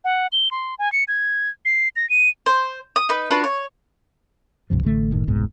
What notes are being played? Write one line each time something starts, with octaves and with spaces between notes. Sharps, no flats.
F#5
G7
C6
G#5
C#7
G#6
C7
A#6
D#7
C5
D#6
D#4 B4
D4 F4 F#4 B4
C#5
C#2 G2 C3 F3
A1 D3 A3
F#1 A2 D#3
F1 C2 G#2 B2